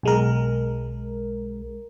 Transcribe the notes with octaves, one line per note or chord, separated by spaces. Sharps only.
B1 G#3 A#4